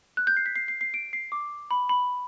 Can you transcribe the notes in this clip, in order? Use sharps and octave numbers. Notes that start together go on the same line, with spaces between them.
F#6
G6
C7
B6
C7
C7
C7
D7
C7
D6
B5
B5